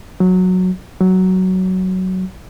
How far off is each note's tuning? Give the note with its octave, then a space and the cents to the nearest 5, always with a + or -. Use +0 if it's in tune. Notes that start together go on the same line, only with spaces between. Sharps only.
F#3 -10
F#3 +10